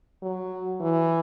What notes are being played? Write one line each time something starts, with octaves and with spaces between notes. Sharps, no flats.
F#3
E3